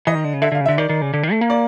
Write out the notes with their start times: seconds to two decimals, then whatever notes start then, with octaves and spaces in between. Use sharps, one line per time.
0.07 E3 D#5
0.15 D#3
0.24 D3
0.34 C#3
0.42 D3 E5
0.52 D3 F5
0.61 C#3
0.66 D3 E5
0.78 D#3 D5
0.89 D#3
1.02 C#3
1.14 D3
1.23 D#3
1.32 A3
1.41 A#3
1.50 D5